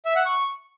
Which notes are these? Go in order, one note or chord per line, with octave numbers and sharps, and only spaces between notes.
E5
F#5
C#6